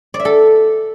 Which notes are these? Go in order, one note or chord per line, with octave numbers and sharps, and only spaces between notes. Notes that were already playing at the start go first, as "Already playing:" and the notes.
D5
E5
A4